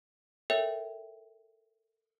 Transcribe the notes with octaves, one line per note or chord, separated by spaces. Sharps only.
A4 A#4 C#5 E5 G5